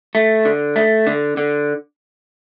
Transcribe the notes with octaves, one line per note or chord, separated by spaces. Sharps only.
A3
D3
A3
D3
D3